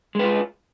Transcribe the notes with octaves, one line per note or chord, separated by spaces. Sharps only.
G#3 F4 B4